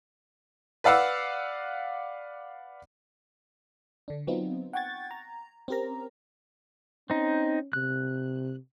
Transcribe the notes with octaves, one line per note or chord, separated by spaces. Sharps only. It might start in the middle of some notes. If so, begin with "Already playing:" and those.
B4 D5 F5 F#5 E6
D3 D4
F#3 B3 C4 D#4 F4
F#5 G5 C#6 G#6 A6
A#5
C4 C#4 G4 A#4 A#5
C4 C#4 D#4
C3 F#6